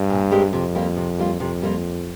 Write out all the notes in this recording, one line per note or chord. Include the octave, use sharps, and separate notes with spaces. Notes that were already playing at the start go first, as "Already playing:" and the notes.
Already playing: G2
A#2
G#3 C4 G4 A#4
F2 C3
G3 A#3 F4
C3
G3 A#3 F4
F2 C3
G3 A#3 F4